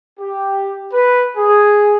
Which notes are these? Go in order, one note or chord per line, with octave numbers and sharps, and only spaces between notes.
G4
B4
G#4